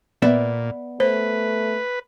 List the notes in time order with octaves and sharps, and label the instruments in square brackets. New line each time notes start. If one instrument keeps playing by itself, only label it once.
[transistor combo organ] A#2 [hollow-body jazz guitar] B3 D5 E5
[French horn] A3 [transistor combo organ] B4 [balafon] C5